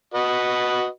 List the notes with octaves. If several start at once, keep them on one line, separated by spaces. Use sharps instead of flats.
F#4 B4 D#5